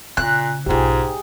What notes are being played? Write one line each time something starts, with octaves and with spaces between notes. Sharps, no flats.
A#2 C#3 F#6
B1 G#2 F4 G4 G#4